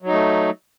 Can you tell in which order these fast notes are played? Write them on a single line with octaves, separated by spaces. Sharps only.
F#3 D#4 A3